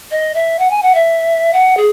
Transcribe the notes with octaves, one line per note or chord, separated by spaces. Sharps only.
D#5
E5
F#5
G#5
F#5
E5
F#5
G#4